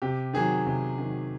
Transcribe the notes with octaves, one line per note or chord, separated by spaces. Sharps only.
C3 G4
D#3 F#3 G#4
C3
D#3 F#3